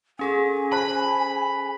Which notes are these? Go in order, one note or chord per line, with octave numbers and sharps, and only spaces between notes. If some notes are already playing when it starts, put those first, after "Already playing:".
C#4 G#4 A4 G#5
C5 A5 B5